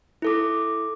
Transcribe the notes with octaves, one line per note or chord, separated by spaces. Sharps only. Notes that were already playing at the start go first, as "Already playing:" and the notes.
E4 A4 D6